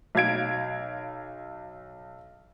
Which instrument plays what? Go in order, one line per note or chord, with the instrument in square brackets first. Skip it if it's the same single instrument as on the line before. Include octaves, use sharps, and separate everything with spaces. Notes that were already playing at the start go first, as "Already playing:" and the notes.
[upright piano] B1 F5 G#6 D7